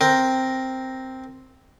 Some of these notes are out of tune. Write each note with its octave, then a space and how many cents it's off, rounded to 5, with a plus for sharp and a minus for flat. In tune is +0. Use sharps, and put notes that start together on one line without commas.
C4 +0 A#4 +0